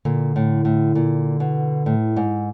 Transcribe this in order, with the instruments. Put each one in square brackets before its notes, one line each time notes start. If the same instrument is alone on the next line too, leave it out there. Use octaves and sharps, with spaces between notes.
[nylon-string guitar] A#2 [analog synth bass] D3
[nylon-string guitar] A2
A2
A#2
B2
A2
G#2